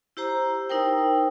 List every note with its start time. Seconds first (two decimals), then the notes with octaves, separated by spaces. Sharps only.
0.17 E4 G4 C5 A#5
0.69 D#4 E4 A#4 C5 G5